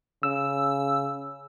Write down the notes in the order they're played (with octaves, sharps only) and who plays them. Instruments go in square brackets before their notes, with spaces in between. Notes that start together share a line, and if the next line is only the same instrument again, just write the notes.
[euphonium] C#3 [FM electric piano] E6